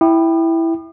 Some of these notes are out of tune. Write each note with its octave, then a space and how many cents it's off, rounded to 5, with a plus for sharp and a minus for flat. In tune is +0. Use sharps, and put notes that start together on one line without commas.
E4 +0 G5 +0 D#6 -45